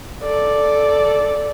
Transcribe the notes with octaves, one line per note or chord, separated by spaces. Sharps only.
A4 D5